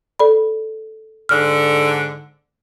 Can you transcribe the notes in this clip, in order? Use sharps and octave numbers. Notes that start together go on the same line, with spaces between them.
A4 D5 B5
G#2 D3 F6